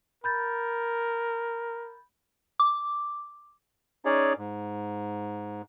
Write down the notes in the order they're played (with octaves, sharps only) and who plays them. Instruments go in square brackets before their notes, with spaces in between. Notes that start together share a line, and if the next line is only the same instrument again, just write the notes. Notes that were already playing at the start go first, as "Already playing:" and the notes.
[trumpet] A#4 [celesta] B5 G6 A6
[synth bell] D6
[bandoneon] C#4 D#4 G#4 C#5 D5
G#2